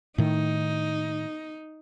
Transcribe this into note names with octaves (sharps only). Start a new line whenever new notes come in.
A2 D#3 D#4